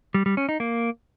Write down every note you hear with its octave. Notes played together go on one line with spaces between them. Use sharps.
G3
G3
C#4
D#4
A#3